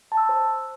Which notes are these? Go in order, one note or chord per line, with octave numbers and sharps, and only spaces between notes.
A5
E6
C6
C5